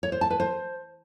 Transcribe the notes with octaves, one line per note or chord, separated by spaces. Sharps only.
C#5
C5
A5
B4
C5